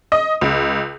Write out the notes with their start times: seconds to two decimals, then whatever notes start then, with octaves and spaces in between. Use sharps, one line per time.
0.12 D#5
0.41 C#2